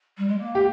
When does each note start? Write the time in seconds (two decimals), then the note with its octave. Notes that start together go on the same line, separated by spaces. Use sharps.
0.18 G3
0.28 G#3
0.38 A#3
0.55 G4